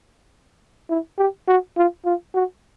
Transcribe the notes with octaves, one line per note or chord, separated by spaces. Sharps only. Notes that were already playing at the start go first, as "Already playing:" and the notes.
E4
G4
F#4
F4
F4
F#4